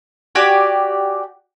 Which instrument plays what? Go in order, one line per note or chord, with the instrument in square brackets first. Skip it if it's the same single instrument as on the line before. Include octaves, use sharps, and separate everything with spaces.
[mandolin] F#4 G4 D5 G#5